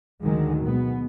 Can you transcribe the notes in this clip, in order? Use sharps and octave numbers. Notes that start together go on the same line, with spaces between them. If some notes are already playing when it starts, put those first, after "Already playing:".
D2 D3 D#3 F#3 G#3
B2 G#3 B3